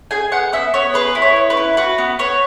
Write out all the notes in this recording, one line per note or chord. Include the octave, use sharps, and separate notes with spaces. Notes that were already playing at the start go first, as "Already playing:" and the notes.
G#4 G#5
B3 F#5
B3 E5
B3 C#5
G#4 B4
E4
C#5
B3
B4
E4
F#4 B4
B3
B3 C#5